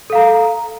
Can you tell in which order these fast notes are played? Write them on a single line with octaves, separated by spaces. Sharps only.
A4 F5 A#5